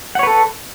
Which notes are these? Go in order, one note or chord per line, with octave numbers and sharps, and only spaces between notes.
A4 B4 C#5 F#5